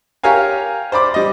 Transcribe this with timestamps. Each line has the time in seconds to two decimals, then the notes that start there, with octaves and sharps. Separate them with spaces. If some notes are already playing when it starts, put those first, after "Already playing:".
0.23 G4 A#4 C#5 F5 G#5
0.92 C5 D5 B5 D6
1.14 G3 D#5